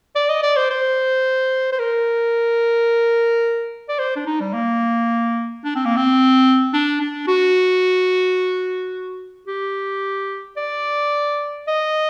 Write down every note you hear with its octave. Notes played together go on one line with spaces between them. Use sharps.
D5
D#5
D5
C5
C5
C5
A#4
D5
C5
D4
D#4
G3
A#3
D4
C4
A#3
C4
D4
D4
F#4
G4
D5
D#5